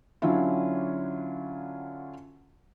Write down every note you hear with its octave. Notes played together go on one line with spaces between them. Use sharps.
D3 F#3 C#4 D4 E4 F4